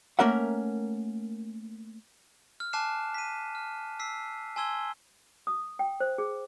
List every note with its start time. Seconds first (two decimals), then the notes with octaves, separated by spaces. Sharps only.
0.19 A3 A#3 C#4 A#4 E5 F#5
2.60 F6
2.73 G#5 A5 D6 F#6 C7 E7
3.14 B6 D#7
3.55 F6
3.99 E6 B6 C7
4.56 G#5 A5 C6 E6 G#6 G7
5.47 D#6
5.79 G5
6.00 C5
6.18 G#4